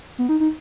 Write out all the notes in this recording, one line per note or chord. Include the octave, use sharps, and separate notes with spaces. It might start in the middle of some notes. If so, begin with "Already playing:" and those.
B3
D#4
D#4